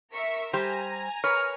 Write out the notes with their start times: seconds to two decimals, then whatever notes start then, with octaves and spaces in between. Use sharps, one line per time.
0.13 A#4 E5 C#6
0.53 G3 G4 C5 G#5 A#5
1.24 A#4 B4 C#5 F6